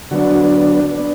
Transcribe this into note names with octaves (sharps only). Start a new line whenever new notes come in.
D3 F#3 B3 D4 F#4
B3 D4